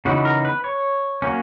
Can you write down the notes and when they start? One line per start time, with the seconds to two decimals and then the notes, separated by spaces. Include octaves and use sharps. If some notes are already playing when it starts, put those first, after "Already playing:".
0.05 C#3 E3 B3 D#4 F#4
0.25 A#4
0.45 B4
0.64 C#5
1.22 F#3 A#3 C#4